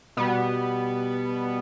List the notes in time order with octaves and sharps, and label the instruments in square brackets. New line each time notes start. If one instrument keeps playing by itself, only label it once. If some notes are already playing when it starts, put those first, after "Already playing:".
[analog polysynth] B2 G3 B3